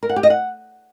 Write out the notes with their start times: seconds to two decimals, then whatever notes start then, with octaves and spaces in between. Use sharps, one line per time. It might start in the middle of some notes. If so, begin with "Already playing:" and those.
0.03 A#4
0.09 F#5
0.16 G4
0.23 D#5
0.30 F#5